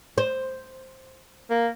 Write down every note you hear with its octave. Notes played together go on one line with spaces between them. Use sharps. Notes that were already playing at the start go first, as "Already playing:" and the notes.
C5
A#3